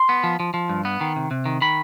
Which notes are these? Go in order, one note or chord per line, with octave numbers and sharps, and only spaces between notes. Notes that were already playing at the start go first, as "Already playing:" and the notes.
Already playing: C6
B3
F3
F3
F3
G2
B3
D#3
C3
C3
D#3
D#3 B5